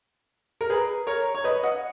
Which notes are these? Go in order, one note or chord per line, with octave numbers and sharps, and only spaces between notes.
A#4
G#4 B4
A#4 C#5
C#5
B4 D#5
D#5 F#5